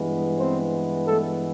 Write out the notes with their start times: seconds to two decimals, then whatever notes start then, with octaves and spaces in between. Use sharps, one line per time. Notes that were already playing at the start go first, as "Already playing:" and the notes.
Already playing: G2 E3 G#3 B3
0.38 C4 C5
1.07 A3 A4